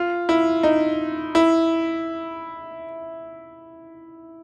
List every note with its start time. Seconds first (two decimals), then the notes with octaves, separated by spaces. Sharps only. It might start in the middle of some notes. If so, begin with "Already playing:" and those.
Already playing: F4
0.29 E4
0.63 D#4
1.35 E4